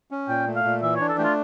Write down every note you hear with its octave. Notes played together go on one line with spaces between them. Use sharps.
C#4
A#2 G5
A3
F5
A#2
E3 E5
D4 C#5
A4
A3 F4 G4